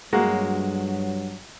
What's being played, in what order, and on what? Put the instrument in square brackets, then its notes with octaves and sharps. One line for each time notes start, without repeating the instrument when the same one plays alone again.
[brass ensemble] G2 F#3 [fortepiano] G#3 A#3 F#4